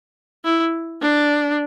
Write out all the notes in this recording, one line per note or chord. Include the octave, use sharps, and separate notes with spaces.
E4
D4